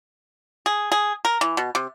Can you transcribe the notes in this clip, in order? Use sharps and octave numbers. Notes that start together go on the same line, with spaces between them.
G#4
G#4
A#4
E3
B2
C3